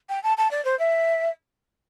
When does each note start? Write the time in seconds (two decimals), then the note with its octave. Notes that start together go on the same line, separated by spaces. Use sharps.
0.09 G5
0.23 A5
0.37 A5
0.51 D5
0.65 C5
0.79 E5